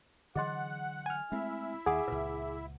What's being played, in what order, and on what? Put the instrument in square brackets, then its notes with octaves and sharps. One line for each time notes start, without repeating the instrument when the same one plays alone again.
[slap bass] D3 E3 F#3 [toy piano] G#4 D#5 C6 [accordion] F#5
[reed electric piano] G#5 F6
[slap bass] G#3 A3 C4 [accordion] E4 E5
[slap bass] D#2 [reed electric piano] G#4 D6 [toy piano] F#5
[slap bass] C#2 A#2 [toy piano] B4